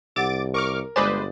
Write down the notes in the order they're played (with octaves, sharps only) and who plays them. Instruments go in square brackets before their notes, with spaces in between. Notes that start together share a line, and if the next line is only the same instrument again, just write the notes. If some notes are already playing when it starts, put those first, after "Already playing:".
[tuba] C2 [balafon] G4 F#5 [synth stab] D6 A6 D7
[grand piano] A#4 [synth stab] C#6 D6 F6
[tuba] G1 [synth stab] G#3 B4 C5 [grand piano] D5 D6 D#6 [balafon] G#5